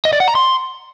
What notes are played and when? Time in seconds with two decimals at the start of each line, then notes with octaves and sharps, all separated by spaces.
0.05 D#5
0.13 D5
0.20 F#5
0.28 A#5
0.35 C6